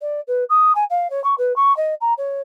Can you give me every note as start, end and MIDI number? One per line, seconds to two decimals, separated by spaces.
0.01 0.20 74
0.27 0.44 71
0.49 0.72 87
0.75 0.84 80
0.90 1.10 77
1.10 1.22 73
1.24 1.35 85
1.38 1.55 71
1.56 1.75 85
1.77 1.94 75
2.01 2.13 82
2.18 2.41 73